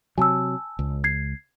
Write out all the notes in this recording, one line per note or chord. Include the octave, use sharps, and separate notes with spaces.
C3 F#3 G#5 A5 E6
C#2
G#6 C7